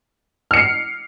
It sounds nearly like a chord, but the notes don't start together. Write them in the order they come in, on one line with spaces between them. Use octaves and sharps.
F6 C#7 C7